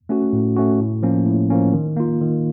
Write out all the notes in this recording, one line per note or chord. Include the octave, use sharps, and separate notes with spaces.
A3 C#4 F#4
A2
A3 C#4 F#4
A2
F3 A#3 C#4
A2
F3 A#3 C#4
D#3
A#3 F4
D#3